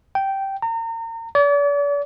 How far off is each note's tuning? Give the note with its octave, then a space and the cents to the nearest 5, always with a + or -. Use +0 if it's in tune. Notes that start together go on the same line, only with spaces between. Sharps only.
G5 -10
A#5 -35
D5 -40